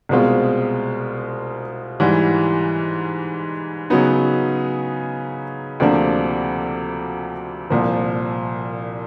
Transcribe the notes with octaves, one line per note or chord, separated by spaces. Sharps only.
C2 B2 G#3 C4 F4
G#2 E3 G3
C#3 F#3 B3 D#4
D2 C3 F3 A#3 D4
C2 A#2 F3